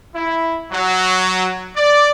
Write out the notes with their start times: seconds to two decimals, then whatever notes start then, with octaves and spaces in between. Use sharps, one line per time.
0.15 E4
0.72 F#3
1.76 D5